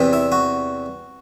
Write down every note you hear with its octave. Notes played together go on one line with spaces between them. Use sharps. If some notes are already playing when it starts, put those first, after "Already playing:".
Already playing: E2 C3 E3
E4
F#4